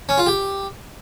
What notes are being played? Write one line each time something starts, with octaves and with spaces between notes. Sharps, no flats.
C#4
F4
G4